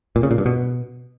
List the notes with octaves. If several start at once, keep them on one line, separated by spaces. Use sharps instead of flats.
A#2
C#3
A#2
G2
B2